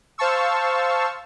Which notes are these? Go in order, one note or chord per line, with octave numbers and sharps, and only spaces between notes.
C5 F5 A5 C#6 E6